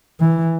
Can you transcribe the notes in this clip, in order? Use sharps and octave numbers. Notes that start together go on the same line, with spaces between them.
E3